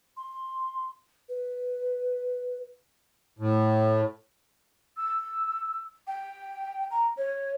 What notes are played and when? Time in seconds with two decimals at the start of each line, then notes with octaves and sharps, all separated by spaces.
0.17 C6
1.29 B4
3.39 A2
4.97 E6
6.07 G5
6.91 A#5
7.17 C#5